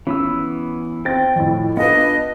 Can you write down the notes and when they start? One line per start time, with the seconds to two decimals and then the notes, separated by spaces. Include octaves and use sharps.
0.07 E3 B3 C#4 E6
1.05 C4 G5 A6
1.36 F2 A2
1.77 B3 D4 F4 B4 D#5